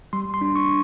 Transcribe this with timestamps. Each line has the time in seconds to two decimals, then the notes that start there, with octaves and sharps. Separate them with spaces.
0.13 G3 C6
0.34 C6
0.41 D4
0.56 C#6